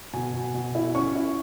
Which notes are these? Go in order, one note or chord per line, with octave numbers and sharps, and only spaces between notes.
B2 G#5
B2
B2
E4
C#4 C#6
E4